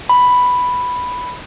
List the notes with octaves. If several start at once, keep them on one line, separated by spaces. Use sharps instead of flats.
B5